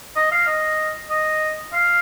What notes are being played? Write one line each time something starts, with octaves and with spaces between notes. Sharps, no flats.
D#5
F5
D#5
D#5
F5